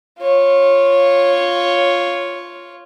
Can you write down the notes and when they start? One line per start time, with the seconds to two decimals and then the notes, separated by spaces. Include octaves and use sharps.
0.20 F4 C#5